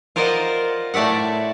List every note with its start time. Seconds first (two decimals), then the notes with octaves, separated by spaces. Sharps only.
0.16 F4 A#4 C5 D5 D#5 F#5
0.94 A2 A3 D5 E5 F#5